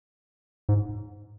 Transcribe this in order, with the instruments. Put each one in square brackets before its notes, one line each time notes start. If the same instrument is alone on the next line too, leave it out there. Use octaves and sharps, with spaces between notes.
[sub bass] G#2